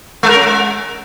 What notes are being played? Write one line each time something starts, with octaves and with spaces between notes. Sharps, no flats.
G#3
A#4
C#4
G#3